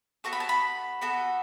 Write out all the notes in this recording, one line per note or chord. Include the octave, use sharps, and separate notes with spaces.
B3 F#4 A4 C#6
B5
A5
B5
B3 F#4 A4